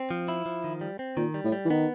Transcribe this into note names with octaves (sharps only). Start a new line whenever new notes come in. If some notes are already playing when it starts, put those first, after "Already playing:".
Already playing: C4
F3
E4
F3
D#3
G3
C4
A#2 D#3
G3
A2
G3
E3
D#3 B3